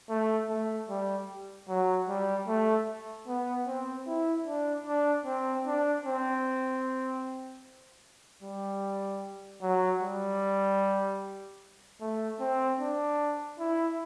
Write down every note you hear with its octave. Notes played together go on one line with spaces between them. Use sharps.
A3
A3
G3
F#3
G3
A3
B3
C4
E4
D4
D4
C4
D4
C4
G3
F#3
G3
A3
C4
D4
E4